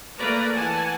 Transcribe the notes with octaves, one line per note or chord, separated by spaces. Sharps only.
A3 A#3 B4 D5 A#5
E3 F#5 G#5 A5